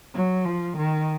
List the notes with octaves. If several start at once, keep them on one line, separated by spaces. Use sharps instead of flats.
F#3
F3
D#3